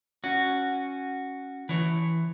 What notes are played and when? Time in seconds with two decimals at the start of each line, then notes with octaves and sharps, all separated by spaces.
0.24 C#4 F#4
1.69 E3 C#5